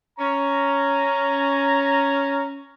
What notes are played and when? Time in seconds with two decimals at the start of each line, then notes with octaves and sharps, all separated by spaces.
0.19 C#4 A#5